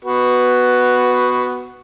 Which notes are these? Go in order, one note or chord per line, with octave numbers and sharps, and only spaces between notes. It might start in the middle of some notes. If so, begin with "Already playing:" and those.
B3 F#4 B4